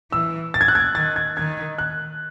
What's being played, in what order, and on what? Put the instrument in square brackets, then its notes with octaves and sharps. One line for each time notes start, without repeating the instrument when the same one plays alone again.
[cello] E3 [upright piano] E6
[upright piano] A6
G#6
F#6
G#6
[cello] D#3 [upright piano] A6
[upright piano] G#6
[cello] D#3 [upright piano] G#6
[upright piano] F#6